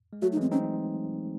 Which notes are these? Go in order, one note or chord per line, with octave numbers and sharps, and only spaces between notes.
G#3
F#3 A3 F#4
D#4
E3 G#3 C4
C4 C#4 D#4